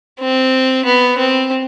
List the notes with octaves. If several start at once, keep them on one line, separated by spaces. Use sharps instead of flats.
C4
B3
C4